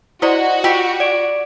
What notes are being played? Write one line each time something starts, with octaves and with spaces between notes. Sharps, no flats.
E4 F#4 C5 D5 D#5
F4 G4 G5
D5 D7